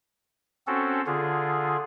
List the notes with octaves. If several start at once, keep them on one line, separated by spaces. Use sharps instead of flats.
C4 C#4 F#4 A4
D3 F4 G#4